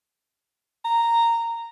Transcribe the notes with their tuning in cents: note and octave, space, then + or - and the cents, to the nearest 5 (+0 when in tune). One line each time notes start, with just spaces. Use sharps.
A#5 -10